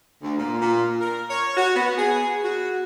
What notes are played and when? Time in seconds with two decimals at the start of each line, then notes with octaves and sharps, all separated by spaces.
0.23 D2
0.37 A#2
0.61 A#2
1.01 A#4
1.30 C#5
1.57 F#4
1.76 B3
1.98 G#4
2.44 F#4